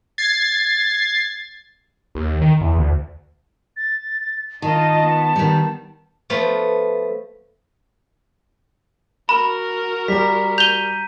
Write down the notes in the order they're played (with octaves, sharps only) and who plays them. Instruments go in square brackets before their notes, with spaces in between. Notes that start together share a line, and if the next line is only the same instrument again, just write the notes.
[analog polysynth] G#6 A6 C7
[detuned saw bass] D#2
D#3
E2
D2
[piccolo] A6
[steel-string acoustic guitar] D#3 [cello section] D#4 F4 D#5 [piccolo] A5
[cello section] B3
[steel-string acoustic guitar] D#3 G3
[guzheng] F3 A3 B3
[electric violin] F#4 A#4 [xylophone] B5
[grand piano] G3 [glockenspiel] A#5 B6
[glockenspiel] G6 D#7 [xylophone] F7 G7